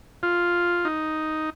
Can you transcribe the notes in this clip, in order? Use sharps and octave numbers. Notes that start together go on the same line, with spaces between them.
F4
D#4